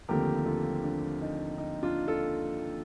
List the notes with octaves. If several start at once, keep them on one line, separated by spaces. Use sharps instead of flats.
D#2 D3 F3 A3 C4 G4 A#4
F4 A4
D4
D#4
D#4
D4 F4
F4 A4